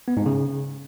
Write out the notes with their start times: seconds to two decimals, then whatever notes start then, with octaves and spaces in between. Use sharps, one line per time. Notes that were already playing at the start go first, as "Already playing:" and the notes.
0.08 B3
0.17 G#2
0.26 C#3